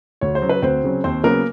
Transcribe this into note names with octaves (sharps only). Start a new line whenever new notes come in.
D2 C#5
C5
C#3 F#3
B4
D2 C4 C5
C#3 F#3
D#2 C4 C5
C#3 F#3 A#3 B3 A#4